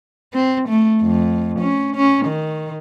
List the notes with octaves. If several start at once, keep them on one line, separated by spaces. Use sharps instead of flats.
C4
A3
F2
C#4
C#4
D#3